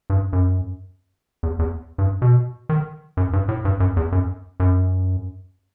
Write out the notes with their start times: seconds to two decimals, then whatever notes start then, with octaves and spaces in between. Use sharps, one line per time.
0.10 G2
0.33 F#2
1.43 E2
1.59 E2
1.98 G2
2.22 B2
2.69 D#3
3.17 F#2
3.33 G2
3.49 A2
3.65 G2
3.80 F#2
3.97 E2
4.12 F#2
4.60 F#2